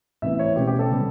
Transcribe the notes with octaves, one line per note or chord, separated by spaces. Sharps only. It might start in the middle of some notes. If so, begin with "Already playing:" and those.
A2 E3 B3 E5
C#5
B2 A3 C#4 G4
G4
A4
D3 G3 B3